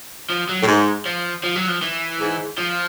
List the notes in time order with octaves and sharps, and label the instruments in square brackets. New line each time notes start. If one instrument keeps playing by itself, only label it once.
[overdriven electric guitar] F3
F#3
[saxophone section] A2
G#2
[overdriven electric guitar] F3
F3
F#3
F3
E3
[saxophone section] G#2
[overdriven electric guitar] F3